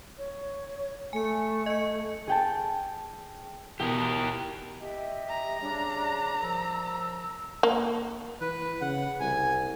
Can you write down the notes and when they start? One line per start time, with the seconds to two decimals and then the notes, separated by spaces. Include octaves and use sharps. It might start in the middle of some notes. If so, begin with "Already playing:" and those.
0.18 C#5
1.13 A3 G#5 C#7
1.66 D#5 C#7
2.27 G#4 G5 A5
3.80 B2 E3 G4 A#4
4.81 G4 D#5 E5
5.29 A#5
5.61 C#3 G3 D4
6.41 F#2 F3 E6
7.63 A#3
8.41 E3 B4
8.81 C#3 F#5
9.20 C2 G#5